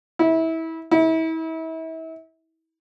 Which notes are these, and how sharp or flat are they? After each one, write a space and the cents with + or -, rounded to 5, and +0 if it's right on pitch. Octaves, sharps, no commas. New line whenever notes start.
E4 -25
E4 -35